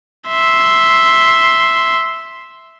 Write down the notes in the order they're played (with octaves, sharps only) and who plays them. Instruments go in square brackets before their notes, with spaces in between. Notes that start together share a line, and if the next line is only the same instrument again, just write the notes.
[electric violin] E5 C6